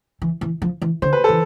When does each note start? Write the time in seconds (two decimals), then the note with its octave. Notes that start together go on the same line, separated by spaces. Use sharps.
0.22 E3
0.41 E3
0.62 F3
0.82 E3
1.02 D3 C5
1.13 B4
1.24 E3 A4